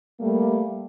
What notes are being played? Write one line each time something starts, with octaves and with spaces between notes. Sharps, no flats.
G3 A3 A#3